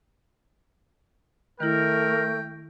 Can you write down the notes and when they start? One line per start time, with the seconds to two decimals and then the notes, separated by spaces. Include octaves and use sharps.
1.60 D#3 A3 E4 A#4 G5